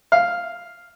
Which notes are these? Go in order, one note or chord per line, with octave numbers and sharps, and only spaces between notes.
F5